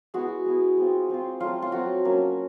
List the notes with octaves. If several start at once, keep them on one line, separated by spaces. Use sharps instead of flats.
G#3 B3 E4 F#4
G#3 B3 E4
G#3 C4 F4
G#3 C4 F4
F#3 A3 C4 F4
F4
F#3 A3 C4 F#4
F#3 A#3 C#4 F4